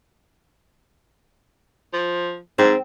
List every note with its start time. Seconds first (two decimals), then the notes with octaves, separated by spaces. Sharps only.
1.93 F3
2.58 G#2 C4